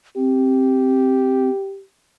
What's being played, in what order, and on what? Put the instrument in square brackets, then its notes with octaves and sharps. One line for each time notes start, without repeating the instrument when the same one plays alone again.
[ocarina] C4 [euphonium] G4